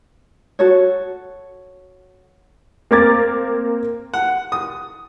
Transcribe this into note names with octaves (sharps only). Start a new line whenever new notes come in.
F#4 A4 C#5
A#3 C4 A#4 D6 G#6 A6
F#5
D#6